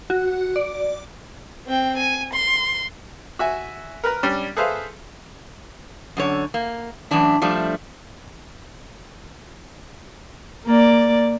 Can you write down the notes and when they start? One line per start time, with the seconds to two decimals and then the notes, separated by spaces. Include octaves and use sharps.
0.10 F#4
0.56 D5
1.66 C4 G5
1.97 G#5
2.33 C6
3.39 F#4 E5 G#5
4.04 A#4 B4 A#5
4.23 G3 C#4 D4
4.57 G#4 A4 B4 C5 E5 F5
6.17 F#2 D3 C#5
6.54 A#3
7.11 F#2 A2 E3 D4 E4
7.42 F3 G3 A3 D4
10.66 A#3 D5